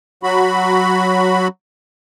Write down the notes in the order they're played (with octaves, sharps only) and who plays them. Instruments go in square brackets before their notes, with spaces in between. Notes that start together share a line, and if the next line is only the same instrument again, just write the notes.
[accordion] F#3 F#4 B5